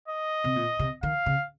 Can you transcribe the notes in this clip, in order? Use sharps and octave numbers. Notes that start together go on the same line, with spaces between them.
D#5
C3
A#2
C3
D#3 F5
C#3